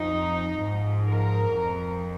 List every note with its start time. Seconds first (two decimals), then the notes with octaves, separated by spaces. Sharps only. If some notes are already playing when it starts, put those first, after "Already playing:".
Already playing: F2 F3 D#4
0.58 G#2 F3
1.05 A#4
1.52 F2 F3